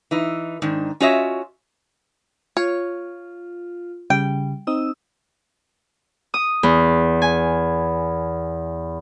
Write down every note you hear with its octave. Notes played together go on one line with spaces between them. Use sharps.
E3 D#4
G#2 D#3 D4
C#4 F4 F#4 C#5 D#5 E5
F4 C#5
C#3 G3 G5
C4 D#4 D#6 E6
D#6
E2
G#5